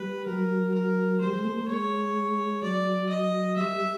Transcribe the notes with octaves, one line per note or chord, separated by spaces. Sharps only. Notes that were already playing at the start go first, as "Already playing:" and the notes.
Already playing: G3 B4
F#3 A#4
A#4
G3 C5
G#3
A3
A#3
G#3 C#5
F#3 D5
D#5
G3 E5